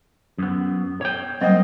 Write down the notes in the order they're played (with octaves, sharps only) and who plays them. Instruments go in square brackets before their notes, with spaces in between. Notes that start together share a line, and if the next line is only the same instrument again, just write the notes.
[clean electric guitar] F#2 B3
C#5 G5
[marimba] F#3 G3 [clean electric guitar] A#3 C4 [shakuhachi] D#5